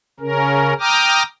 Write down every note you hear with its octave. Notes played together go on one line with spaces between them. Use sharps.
C#3 C#4 A#4
G5 A#5 D6 D#6 F6